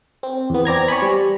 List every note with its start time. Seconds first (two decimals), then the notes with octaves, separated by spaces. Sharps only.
0.23 C4
0.50 E2 B3
0.65 C4 D5 A#5 G#6
0.88 C#5 D5 G#5 B5
1.02 G3